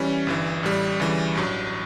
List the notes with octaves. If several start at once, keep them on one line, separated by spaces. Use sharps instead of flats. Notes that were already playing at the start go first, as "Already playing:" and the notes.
Already playing: E3 G3 C#4
G1 G2 E3
A1 A2 G3
D2 C#3 E3 G3
A1 G2 F#3